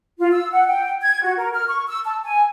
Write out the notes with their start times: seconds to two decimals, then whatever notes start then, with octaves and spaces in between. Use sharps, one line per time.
0.19 F4
0.32 E6
0.51 F#5
0.67 G5
1.02 G#6
1.22 F#4
1.37 A#4
1.53 F6
1.68 C#6
1.87 E6
2.05 A5
2.23 G#5